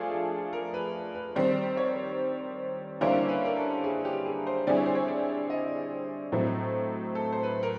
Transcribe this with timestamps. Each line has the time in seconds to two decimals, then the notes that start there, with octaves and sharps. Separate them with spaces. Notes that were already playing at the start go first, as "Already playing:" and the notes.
Already playing: F3 A3 D4 F4 G#4 A4
0.11 A4
0.53 A#4
0.74 B4
1.15 B4
1.36 D#3 G3 C4 C5
1.77 C#5
3.01 D3 G3 A#3 C#4 E4 C5
3.29 B4
3.45 A#4
3.56 A4
3.84 G#4
4.05 G4
4.26 G#4
4.47 C5
4.67 D3 G3 C4 E4 G#4 D5
4.77 C#5
4.86 C5
4.95 C#5
5.08 D5
5.50 D#5
6.32 A2 F#3 A3 C4
7.15 A4
7.32 C5
7.43 B4
7.63 A#4